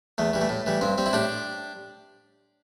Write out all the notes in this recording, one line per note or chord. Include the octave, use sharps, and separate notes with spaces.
E2 A3
E3 G3
A3
A2
E3 G3
G2 C4
G3 C4
E4
A2 D4 G4